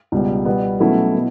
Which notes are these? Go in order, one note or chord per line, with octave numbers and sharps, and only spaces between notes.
C#2 B2 G3
B2 G3 B3
B2 F#3 A3 C#4 E4
B2